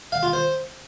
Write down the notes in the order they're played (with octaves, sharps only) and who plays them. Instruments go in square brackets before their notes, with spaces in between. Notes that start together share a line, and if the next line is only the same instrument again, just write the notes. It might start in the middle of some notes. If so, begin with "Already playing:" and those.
[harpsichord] F5
F4
C5